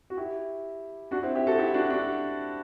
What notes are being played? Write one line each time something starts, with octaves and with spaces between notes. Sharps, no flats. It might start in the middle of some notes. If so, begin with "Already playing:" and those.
F#4
E4 G4
D4 F#4
C4 E4
E4 G4
F#4 A4
E4 G4
D4 F#4
D4 F#4